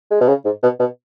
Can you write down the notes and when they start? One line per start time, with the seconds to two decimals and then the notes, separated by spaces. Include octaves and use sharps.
0.11 G#3
0.21 B2
0.28 C#3
0.45 G#2
0.63 B2
0.80 B2